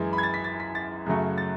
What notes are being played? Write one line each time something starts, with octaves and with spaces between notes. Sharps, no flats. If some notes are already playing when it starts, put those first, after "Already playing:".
Already playing: F#2 E3 G#3
B5
G#6
A6
B6
A6
B6
A6
F#2 C#3 F#3 A3
A6